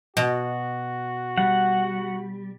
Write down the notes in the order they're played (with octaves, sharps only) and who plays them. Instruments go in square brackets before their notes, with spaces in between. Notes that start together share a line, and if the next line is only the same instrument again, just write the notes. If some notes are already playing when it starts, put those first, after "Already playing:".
[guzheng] B2 [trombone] F#4
[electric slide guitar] G3 [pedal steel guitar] F#5